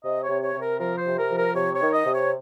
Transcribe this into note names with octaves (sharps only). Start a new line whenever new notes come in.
C3 D#5
C#5
C3
C#5
C3
A#4
F3 A#4
C5
C3
A#4
F3
A#4
C3 C#5
C#5
D#3
D#5
C3
C#5